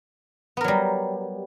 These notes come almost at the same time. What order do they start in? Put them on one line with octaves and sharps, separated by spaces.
B3 A#4 F#3 G3